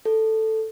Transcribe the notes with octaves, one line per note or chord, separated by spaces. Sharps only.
A4